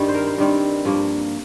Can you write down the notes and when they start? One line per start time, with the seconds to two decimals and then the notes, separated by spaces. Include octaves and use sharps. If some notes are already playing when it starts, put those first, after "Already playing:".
Already playing: G2 D#3 G3 C4
0.08 C5
0.15 A#4
0.27 C5
0.38 G2 D#3 G3 C4 A#4
0.85 G2 F3 A#3